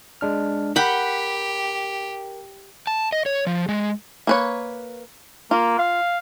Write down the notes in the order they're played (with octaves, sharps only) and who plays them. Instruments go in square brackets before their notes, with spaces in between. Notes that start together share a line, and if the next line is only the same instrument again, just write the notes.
[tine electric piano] G#3 D4 F6
[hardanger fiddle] G4 [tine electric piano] A#4 [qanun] F#5 G5 B5
[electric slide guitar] A5
D#5
C#5
F3
G#3
[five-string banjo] A#3 B4 C#5
[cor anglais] A#3 [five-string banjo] F4
[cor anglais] F5